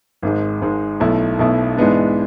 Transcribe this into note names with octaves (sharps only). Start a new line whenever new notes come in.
G#1 G#2 G#3
G#1 G#2 G#3
B1 B2 A3 E4
B1 B2 A3 E4
G#2 E3 G#3 B3 D4